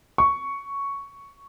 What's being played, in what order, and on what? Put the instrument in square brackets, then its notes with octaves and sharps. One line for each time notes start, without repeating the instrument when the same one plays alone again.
[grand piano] C#6